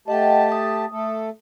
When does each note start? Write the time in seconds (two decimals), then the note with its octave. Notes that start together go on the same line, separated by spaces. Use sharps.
0.08 A3 G4 D#5 F#5 G5 A5
0.52 D#6
0.92 A3 A4